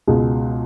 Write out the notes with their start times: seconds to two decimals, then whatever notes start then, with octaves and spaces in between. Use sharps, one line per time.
0.08 C#2 B2 G#3